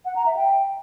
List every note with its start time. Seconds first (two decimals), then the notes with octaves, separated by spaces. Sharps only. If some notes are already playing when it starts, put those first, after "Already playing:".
0.05 F#5
0.16 A#5
0.26 E5
0.37 G5